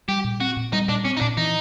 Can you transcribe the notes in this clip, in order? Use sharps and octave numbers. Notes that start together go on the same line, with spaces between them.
G3 G4
A#2
C4 F#4
A#2
G3 D#4
A#2 D4
C4 C#4
D#4
A#2 D4
E3 D#4